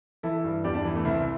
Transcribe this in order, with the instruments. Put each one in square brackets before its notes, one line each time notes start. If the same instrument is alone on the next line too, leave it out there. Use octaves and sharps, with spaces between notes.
[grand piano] E3 E4 A4
G2
E2 D4 G4
D4 G4
E3
A3 D4
C2 C4 E4